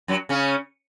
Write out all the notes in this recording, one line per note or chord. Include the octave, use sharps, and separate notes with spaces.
F#2 F#3
C#3 C#4